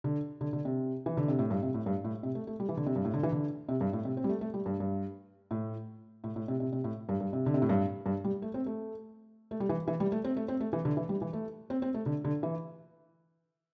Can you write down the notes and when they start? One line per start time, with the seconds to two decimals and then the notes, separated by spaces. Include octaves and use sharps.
0.04 D3
0.41 D3
0.53 D3
0.65 C3
1.06 E3
1.17 D3
1.28 C3
1.39 A2
1.50 G2
1.63 C3
1.74 A2
1.86 G2
2.04 A2
2.23 C3
2.35 A3
2.47 A3
2.60 G3
2.69 E3
2.77 D3
2.86 C3
2.96 G2
3.05 A2
3.14 D3
3.23 E3
3.32 D3
3.69 C3
3.81 G2
3.93 A2
4.05 C3
4.17 C4
4.24 G3
4.29 A3
4.41 A3
4.54 G3
4.66 G2
4.80 G2
5.51 A2
6.24 A2
6.36 A2
6.48 C3
6.60 C3
6.72 C3
6.84 A2
7.09 G2
7.20 G2
7.33 C3
7.46 D3
7.54 C3
7.62 A2
7.69 G2
8.06 G2
8.24 G3
8.42 A3
8.54 C4
8.66 A3
9.51 A3
9.60 G3
9.69 E3
9.88 E3
10.00 G3
10.12 A3
10.24 C4
10.37 A3
10.48 C4
10.60 A3
10.73 E3
10.85 D3
10.97 E3
11.09 G3
11.22 E3
11.33 A3
11.70 C4
11.82 C4
11.94 A3
12.06 D3
12.24 D3
12.43 E3